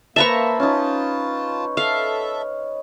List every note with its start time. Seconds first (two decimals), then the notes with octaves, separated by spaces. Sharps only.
0.16 A#3 B4 C5 E5 A5 A#5 C#6
0.60 C#4 D#4 F4 A5
1.77 A4 E5 F5